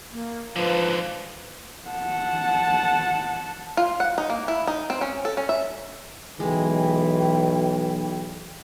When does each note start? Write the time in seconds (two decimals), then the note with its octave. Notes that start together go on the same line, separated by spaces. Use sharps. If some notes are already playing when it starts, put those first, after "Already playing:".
0.12 A#3
0.56 G#2 D3 F3 B4
1.89 F#5 A5
3.77 F4
4.00 F#5
4.18 D#4
4.30 A#3
4.48 E4
4.67 D#4
4.90 C4
5.01 C#4
5.25 A4
5.37 C#4
5.49 E5
6.40 B1 E3 G#3 G5